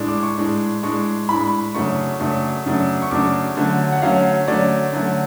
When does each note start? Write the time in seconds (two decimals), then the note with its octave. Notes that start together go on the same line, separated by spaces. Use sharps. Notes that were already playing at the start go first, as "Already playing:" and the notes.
Already playing: A2 G#3 D4
0.08 D6
0.23 C#6
0.38 A2 G#3 D4
0.83 A2 G#3 D4 C#6
1.29 A2 G#3 D4 B5
1.75 F#2 C#3 F#3 A3 D4 C#6
2.20 F#2 C#3 F#3 A3 D4
2.66 F#2 C#3 F#3 A3 D4
3.02 C#6
3.11 F#2 C#3 F#3 A3 D4 D6
3.57 D3 F#3 A3 C#4
3.92 F#5
4.02 D3 F#3 A3 C#4 F5
4.48 D3 F#3 A3 C#4 D5
4.93 D3 F#3 A3 C#4